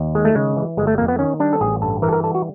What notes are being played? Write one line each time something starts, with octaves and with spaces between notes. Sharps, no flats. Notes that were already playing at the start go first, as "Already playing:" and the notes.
Already playing: D#2
D#3 G#3
A3
C#3 G#3
E3
G1 G#3
A3
F2 A#3
B3
D#3 C#4
G3 D4
A4
A1 G#4
G2 A4
E3 A#4
A4
A#4
G3 A4
F#4